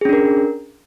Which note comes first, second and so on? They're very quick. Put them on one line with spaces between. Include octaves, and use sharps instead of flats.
G#4 C#4 D4 A#4